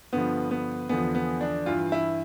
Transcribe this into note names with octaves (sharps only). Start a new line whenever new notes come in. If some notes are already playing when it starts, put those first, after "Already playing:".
G2 D3 F3 B3
B3
E2 D3 F3 B3
B3
D4
G2 E3 F4
E4